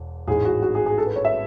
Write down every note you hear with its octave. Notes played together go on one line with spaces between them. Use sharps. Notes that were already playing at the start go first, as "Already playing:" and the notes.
Already playing: E1 E2
A1 G#2 G#3 G#4
F#4
F#4
G#4
G#4
A4
B4
C#5
E5